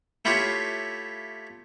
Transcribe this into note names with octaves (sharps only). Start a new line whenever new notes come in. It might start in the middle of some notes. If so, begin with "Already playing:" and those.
A3 E4 F4 G4 C#5 F5